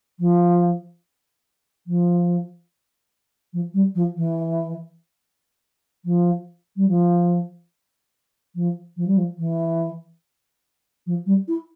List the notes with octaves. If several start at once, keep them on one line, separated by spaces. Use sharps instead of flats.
F3
F3
F3
G3
F3
E3
F3
G3
F3
F3
F3
G3
F3
E3
F3
G3
E4